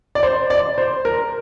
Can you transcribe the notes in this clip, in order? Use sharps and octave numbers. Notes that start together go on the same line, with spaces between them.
D5
C5
D5
C5
A#4